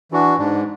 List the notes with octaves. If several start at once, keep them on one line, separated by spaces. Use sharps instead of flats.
E3 D4 F#4
G#2 D4